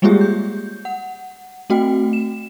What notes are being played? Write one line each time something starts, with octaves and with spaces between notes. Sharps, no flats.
G3 G#3 A#3 F4 G4 G#4
G6
F#5
A3 C4 F#4 G5
E7